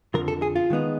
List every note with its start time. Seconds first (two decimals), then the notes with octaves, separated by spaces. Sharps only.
0.14 F2 D3 F3 A#4
0.28 A4
0.42 G#4
0.56 F4
0.70 D#3 G#3 B3 D#4